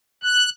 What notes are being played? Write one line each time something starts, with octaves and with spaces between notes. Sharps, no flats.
F#6